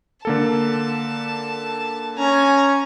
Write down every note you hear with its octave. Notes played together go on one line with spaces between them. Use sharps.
D3 A#3 A4 A5
C#4 G#5 A#5